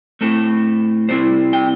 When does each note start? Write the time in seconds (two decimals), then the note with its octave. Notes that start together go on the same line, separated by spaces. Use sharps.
0.21 A2 A3 C4 A4
1.09 C3 G3 C4 E4 C5
1.53 G5